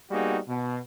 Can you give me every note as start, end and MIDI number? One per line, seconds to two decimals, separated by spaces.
0.11 0.37 55
0.11 0.37 58
0.11 0.37 59
0.11 0.37 63
0.11 0.37 66
0.11 0.37 68
0.47 0.78 47